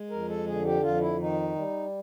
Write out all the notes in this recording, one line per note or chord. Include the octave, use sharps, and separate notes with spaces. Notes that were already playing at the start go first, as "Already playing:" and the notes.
Already playing: G#3
F2 A#4
A4
D3 G#4
G4
F2 F4
E4
D#3 D#4
G3